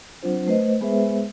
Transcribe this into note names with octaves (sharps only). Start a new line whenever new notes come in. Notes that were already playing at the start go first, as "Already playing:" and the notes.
F#3 C4 D4 F4 C5
A3 B4 C5 D#5
G#3 B3 G#4 B4 C5 E5